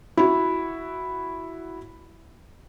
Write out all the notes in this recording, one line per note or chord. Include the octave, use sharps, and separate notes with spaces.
E4 F#4